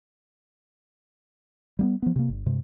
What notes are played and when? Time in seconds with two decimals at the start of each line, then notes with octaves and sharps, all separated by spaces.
1.79 G3 A#3 B3
2.02 F3 B3
2.16 C3 A#3
2.29 G1
2.46 G2 C3 G#3